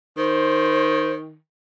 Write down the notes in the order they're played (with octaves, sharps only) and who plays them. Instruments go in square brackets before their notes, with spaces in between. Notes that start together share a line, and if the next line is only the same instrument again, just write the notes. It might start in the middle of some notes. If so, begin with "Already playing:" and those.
[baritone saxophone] D#3 [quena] C5